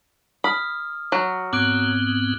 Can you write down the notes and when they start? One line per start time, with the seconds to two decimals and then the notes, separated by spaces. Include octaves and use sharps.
0.44 B5 D#6 F6
1.12 F#3
1.53 G#2 B3 C4 D6 F#6 D7